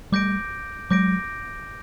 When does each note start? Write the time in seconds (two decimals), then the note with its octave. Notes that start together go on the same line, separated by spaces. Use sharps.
0.12 G3 A3 D6 G6 A#6 D7
0.90 F#3 G#3 D6 G6 A#6 D7